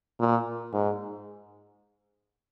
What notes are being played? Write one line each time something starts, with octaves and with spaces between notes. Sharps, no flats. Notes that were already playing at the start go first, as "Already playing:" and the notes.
A#2
G#2